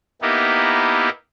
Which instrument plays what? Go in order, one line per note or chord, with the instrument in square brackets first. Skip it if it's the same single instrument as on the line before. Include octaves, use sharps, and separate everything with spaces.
[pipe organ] A#3 B3 D#4 E4 G4